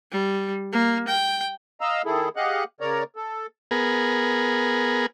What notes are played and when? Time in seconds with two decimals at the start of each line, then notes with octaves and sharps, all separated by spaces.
0.12 G3
0.73 A#3
1.08 G5
1.81 D#5 F5 A#5 E6
2.05 D#3 E4 G#4 A4
2.36 G4 G#4 D#5 F5 F#5 F#6
2.81 C#3 A#4 C#5 D5 A#5
3.16 A4
3.71 B3 G#4 A#4